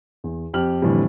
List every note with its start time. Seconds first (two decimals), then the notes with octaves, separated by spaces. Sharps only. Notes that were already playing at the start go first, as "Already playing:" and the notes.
0.24 E2
0.54 F2 G4 F6 F#7
0.82 F2 A2 D3 E3 G3